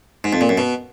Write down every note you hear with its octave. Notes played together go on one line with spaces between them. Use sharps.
G#2
F2
A#2
F#2
B2